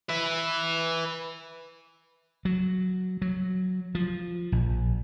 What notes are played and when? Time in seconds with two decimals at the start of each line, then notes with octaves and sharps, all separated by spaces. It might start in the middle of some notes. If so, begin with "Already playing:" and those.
0.09 B4 E5
2.45 F#3
3.22 F#3
3.95 F3
4.52 A#1